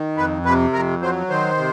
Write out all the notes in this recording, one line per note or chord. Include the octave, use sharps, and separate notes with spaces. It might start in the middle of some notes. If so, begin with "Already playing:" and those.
Already playing: D#3
F2 B4
C3 B4
F2 A#4
F#3 C5
D#3 C5
C3